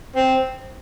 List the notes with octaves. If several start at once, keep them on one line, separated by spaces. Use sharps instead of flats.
C4